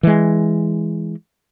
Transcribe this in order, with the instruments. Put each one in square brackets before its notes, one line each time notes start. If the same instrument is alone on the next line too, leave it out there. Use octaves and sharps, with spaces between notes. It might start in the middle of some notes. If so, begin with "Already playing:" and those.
[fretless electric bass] E3 G#3